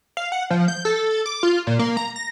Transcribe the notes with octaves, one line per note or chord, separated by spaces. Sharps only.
F5
F#5
F3
G6
A4
D6
F4
A#2
A#3
A#5
A#6